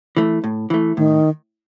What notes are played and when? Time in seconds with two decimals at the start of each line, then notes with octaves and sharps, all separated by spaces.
0.17 E3 A3
0.44 A2
0.70 E3 A3
0.97 A2 D#3